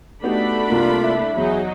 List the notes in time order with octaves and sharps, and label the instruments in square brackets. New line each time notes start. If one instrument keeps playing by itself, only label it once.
[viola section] A3 D4 B5 [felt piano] B3 D#4 G4 [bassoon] F#4
[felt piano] C2 A#3 [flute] F4
[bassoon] E4
[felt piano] E2 [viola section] F#3 D#4 [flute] G#4